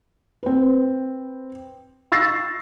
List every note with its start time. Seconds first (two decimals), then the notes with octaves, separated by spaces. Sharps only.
0.43 C4 B4
2.12 C#6 E6 A6 A#6 C7